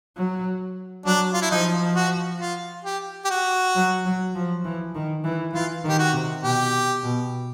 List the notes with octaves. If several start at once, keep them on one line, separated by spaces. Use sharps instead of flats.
F#3
F#3 D4
F4
E4
F3 D#4
F#4
F4
G4
G4
F#4
F#3
F#3
F3
E3
D#3
E3
E3 F4
D#3
G4
F#4
C3
B2 G4
B2